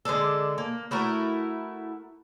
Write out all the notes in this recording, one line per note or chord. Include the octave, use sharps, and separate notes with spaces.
D3 G#3 D4 A4
A#3
A3 E4 F#4 A#4